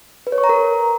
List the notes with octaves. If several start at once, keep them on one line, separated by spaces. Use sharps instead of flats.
B4
C#5
C#6
A#5
A#4